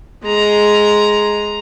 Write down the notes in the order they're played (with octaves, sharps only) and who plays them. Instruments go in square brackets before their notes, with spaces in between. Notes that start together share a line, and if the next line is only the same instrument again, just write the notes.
[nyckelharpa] G#3 A#5